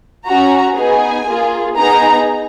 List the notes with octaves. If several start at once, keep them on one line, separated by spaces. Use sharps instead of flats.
C#4 F#4 A#5
B3 D#4 G#4 G#5
A#3 F4 G#4
B3 D#4 G#4 A#5